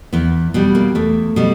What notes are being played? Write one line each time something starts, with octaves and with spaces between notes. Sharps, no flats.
E2 B3
B2 G3 B3
A#3
E2 A3
B2 G3